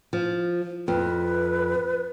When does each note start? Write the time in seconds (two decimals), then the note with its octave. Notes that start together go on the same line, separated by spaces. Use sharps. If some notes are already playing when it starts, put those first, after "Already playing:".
0.13 F3
0.88 F2 B4